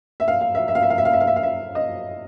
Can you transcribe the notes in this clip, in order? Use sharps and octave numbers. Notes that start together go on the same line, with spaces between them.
E5
F5
F5
E5
E5
F5
E5
F5
E5
F5
E5
F5
E5
F5
E5
D#5